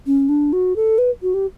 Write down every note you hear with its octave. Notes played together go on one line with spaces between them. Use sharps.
C#4
D4
F#4
A4
B4
F#4
G4